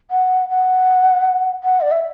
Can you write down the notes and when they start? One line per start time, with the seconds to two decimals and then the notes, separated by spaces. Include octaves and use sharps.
0.11 F#5
0.50 F#5
1.64 F#5
1.81 D5
1.91 E5